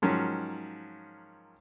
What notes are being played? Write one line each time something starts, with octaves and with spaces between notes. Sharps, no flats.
G#2 D#3 F3 F#3 C#4